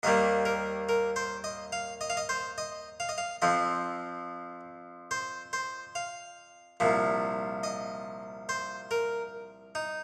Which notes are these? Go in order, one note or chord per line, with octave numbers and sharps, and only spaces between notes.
D#2 D#3 G3 A#3 D#5
A#4
A#4
C5
D#5
F5
D#5
F5
D#5
C5
D#5
F5
D#5
F5
F2 F3 C4 D#5
C5
C5
F5
C2 A#2 F3
D#5
C5
A#4
D#4